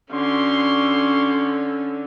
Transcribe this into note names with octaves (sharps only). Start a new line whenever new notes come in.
D3 C#4 F#4 C6